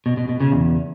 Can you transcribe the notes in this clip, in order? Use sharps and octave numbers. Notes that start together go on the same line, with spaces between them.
B2
B2
B2
C#3
E2